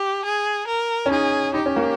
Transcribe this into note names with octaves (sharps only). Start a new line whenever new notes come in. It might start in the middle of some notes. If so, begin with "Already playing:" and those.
Already playing: G4
G#4
A#4
C#4
D#4 G#4
D#4 G4
C#4
A#3